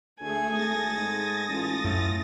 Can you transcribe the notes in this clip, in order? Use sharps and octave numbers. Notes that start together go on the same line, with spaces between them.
D2 A3 G#4 A4 G#5
G#1 D#6 A6 A#6
G#2
A1 F4 A4
F#2 A2